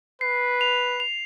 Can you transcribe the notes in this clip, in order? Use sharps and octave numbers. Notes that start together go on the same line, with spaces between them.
B4 C7
F7
F7